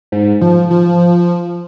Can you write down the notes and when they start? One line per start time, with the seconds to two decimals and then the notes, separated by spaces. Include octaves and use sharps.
0.12 G#2
0.41 F3
0.71 F3